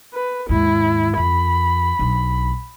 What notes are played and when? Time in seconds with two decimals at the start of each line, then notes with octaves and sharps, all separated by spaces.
0.13 B4
0.49 D#2 G#2 E4
1.17 F2 B5
1.99 B1 D4